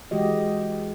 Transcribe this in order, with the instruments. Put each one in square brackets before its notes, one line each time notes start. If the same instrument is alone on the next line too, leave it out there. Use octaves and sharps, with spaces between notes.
[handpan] E3 G#3 F#4 G4 D#5